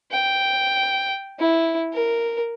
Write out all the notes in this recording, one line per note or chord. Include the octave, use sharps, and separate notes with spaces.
G5
E4
A#4